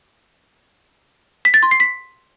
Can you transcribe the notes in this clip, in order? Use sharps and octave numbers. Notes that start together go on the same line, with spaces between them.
B6
A6
C6
C7
B6